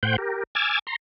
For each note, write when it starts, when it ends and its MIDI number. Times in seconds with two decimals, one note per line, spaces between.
0.03 0.16 45
0.03 0.16 72
0.03 0.16 78
0.03 0.16 79
0.03 0.16 91
0.18 0.43 67
0.18 0.43 70
0.55 0.79 80
0.55 0.79 86
0.55 0.79 88
0.55 0.79 89
0.55 0.79 92
0.55 0.79 93
0.87 0.96 82
0.87 0.96 84